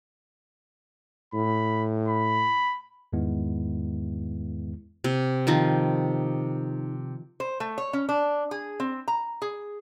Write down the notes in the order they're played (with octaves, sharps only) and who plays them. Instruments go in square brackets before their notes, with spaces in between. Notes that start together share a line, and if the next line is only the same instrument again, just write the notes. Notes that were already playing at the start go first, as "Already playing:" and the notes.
[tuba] A2 [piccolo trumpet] B5
[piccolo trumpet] B5
[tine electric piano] E2 G#2 D#3 G#3 B3 E4
[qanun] C3
D#3 F3 D#4
[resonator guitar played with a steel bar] C5
A3
C#5
C#4
D4
G#4
C4
A#5
G#4